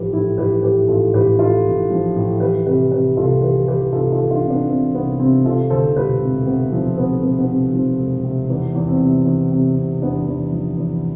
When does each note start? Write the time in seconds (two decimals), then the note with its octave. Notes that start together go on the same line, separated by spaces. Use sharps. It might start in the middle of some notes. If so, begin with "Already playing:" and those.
Already playing: A1 A2 F3 G4 B4
0.12 A2 E4 G4
0.38 A1 G4 B4
0.63 A2 G4 B4
0.88 A1 F4 A4
1.14 A1 G4 B4
1.39 A1 F4 A4
1.65 A1
1.90 F3
2.16 A2
2.40 E3 G4 B4
2.66 C3 G4 B4
2.91 C3 G4 B4
3.17 C2 F4 A4
3.42 E3 G4 B4
3.67 E3 G4 B4
3.92 C2 F4 A4
4.12 F4 A4
4.19 E3
4.31 D4 F4
4.43 C3
4.50 B3 D4
4.68 E3 C4
4.94 C2 B3
5.19 C3 C4
5.45 C3 F4 A4
5.70 D2 A4 C5
5.95 E1 G4 B4
6.21 C3
6.46 C3 B3
6.72 F3 C4
6.97 C3 B3
7.22 C3 B3
7.38 B3
7.48 C3 C4
7.73 F3 C4
7.99 E1
8.24 C3
8.49 E2 B3
8.75 E2
8.88 C4
9.00 C3
9.25 E2
9.51 C3
9.76 C3
10.01 E2 B3 D4
10.27 E2
10.52 F3
10.77 E2